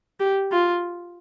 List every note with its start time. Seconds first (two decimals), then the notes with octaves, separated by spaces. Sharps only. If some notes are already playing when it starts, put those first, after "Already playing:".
0.20 G4
0.52 F4